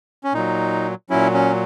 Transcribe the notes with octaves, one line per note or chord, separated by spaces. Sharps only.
C#4
A#2 F#3 D#4
A#2 F#3 C#4 E4
C#4